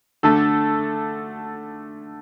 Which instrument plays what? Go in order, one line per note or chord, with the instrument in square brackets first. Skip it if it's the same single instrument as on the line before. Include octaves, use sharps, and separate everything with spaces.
[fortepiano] D3 A3 A4